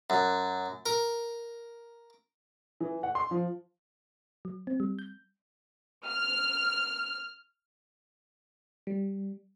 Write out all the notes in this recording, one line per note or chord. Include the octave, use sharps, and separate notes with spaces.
F#2
A#4
E3
F#5
C6
F3
F#3
C4
G3
G6
F6
G3